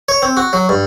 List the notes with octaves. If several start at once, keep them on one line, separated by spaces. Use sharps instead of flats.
C#5
C4
F#4
F#3
G2